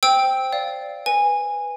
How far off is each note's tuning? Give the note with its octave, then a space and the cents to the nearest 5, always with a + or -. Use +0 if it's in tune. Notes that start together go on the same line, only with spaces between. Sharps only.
C5 +0 G5 +0 E6 -20
D5 -10 F5 +0
B4 +0 G#5 -15